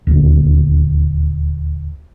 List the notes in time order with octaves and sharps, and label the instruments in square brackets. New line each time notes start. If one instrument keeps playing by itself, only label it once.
[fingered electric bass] D#1 D2